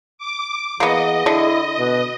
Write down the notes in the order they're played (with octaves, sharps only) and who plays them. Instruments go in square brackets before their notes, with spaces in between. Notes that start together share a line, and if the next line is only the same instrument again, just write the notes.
[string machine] D6
[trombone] E3 [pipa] A#3 B3 [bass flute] G#4 [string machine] D#5
[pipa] D3 [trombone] E4
[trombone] B2 [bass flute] B4